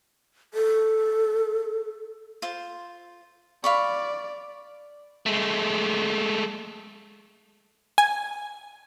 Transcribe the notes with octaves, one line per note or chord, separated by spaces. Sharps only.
A4
F4 C5
D5 F5 B5 C#6
G#3 A3
G#5